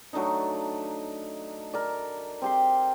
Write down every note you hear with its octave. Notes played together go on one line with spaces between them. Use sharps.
F#3 A3 D4 D#4
A#4 D5
C4 G4 C6